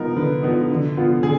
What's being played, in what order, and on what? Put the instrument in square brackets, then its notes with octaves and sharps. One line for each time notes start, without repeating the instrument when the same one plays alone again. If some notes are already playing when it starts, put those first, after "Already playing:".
Already playing: [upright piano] F3 B3 D#4 [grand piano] A#4
[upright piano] D3 [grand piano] B4
[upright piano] F3 B3 D#4
D3
F3 B3 F4
[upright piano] D3 [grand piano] G#4